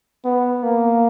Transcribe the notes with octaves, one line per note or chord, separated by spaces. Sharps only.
B3
A#3